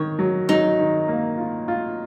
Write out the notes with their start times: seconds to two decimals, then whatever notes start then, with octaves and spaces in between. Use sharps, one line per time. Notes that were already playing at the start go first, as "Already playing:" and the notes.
Already playing: D#3 C#5
0.19 F#3
0.49 F#3 D#4
0.79 D#3
1.08 A#3
1.38 F4
1.68 F4